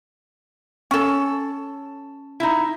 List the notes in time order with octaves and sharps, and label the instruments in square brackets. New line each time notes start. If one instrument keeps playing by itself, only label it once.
[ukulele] C#4 A4
[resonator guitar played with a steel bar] D#4 E4